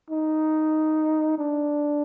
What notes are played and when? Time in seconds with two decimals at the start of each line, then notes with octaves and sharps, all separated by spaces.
0.10 D#4
1.38 D4